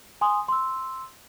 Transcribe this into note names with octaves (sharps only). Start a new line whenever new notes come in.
G#5 C6 D#6
C6 E6